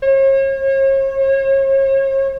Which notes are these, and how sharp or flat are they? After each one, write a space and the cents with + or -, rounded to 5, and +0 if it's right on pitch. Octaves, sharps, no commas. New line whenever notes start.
C#5 -40